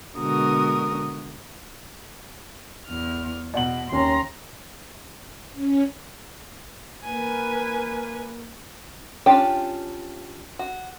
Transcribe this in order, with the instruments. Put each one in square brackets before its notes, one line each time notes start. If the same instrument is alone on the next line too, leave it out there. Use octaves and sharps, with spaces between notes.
[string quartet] B2 D3 G#3 F#4 A#4 D#6
E2 F6
[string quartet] E2 B2 [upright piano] D5 F#5 F#7
[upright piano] D#2 C#4 [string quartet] A#5 C6
[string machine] C#4
[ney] A#3 [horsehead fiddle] B4 G#5
[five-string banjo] C#4 D4 F4 G4 G5
F#4